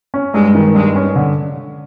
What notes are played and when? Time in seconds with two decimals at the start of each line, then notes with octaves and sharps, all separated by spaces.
0.14 C#4
0.34 G2 G#3
0.55 D#3
0.75 G2 G#3
0.96 C#4
1.16 D3